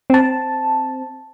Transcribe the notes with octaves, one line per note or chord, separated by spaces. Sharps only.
C4 A5